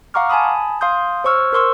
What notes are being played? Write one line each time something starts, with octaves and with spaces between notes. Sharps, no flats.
F5 F#5 A#5 C#6 D6 F6
G#5 A5 B5 D#6
F5 C6 D#6 G6
C5 C#5 C#6 E6 F6
A#4 C5 C6 C#6 E6